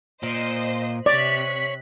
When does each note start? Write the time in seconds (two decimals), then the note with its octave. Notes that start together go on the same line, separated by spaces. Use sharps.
0.23 A#2 C5 D#5
1.06 C3 C#5 D5 F#6 B6